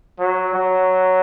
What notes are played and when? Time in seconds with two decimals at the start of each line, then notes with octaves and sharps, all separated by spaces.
0.19 F#3
0.54 F#3